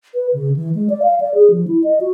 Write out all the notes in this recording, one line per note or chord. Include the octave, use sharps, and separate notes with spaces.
B4
C#3
E3
G#3
D5
F5
D5
G#4
F3
E4
D#5
F#4